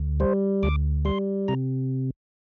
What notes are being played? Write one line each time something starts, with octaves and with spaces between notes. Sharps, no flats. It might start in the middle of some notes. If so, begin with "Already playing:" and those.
Already playing: D2
G3 C5
D2 D6
G3 C6
C3 A#5